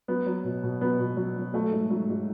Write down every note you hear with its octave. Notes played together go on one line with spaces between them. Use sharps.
F#3 B3
F#3
B2
B2
F#3 B3
B2
F#3
F#3
F#3 A3
G#2
F#3
G#2